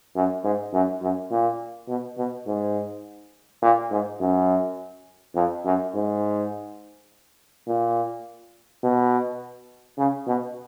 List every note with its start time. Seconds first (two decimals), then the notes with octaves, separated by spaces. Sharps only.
0.16 F#2
0.44 G#2
0.73 F#2
1.02 F#2
1.31 A#2
1.88 B2
2.17 B2
2.47 G#2
3.62 A#2
3.91 G#2
4.20 F#2
5.35 F2
5.65 F#2
5.94 G#2
7.67 A#2
8.83 B2
9.98 C#3
10.27 B2